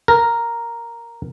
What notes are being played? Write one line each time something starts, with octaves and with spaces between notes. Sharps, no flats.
A#4